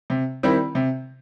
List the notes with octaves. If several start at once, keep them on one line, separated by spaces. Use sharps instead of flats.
C3
D#3 G3 C4 E4
C3